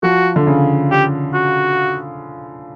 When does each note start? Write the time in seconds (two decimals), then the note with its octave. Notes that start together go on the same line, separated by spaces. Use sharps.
0.03 F3 F#4
0.36 D3
0.47 C#3
0.91 G4
1.34 F#4